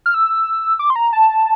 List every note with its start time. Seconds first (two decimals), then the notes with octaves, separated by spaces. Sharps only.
0.06 F6
0.14 E6
0.79 D6
0.90 C6
0.96 A#5
1.13 A5